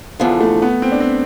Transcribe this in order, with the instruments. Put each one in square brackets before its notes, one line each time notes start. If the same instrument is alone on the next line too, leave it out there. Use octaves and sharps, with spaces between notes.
[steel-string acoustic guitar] E2 D3 F3 [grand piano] B3
[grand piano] A3
B3
C4
D4
C4